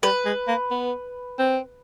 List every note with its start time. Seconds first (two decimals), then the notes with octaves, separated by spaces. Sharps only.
0.03 G3 B4
0.25 G#3
0.48 A#3
0.71 B3
1.39 C4